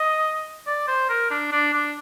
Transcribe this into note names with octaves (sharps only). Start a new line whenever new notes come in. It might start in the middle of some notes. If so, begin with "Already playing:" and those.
Already playing: D#5
D5
C5
A#4
D4
D4
D4